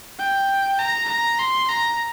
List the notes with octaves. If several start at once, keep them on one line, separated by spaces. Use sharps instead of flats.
G5
A#5
A#5
C6
A#5